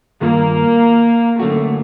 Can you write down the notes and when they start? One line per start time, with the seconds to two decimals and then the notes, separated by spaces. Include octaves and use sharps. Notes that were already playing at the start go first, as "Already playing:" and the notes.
0.21 G2 D#3 A#3 F4
1.40 D3 F#3 A3 A#3 C#4 F#4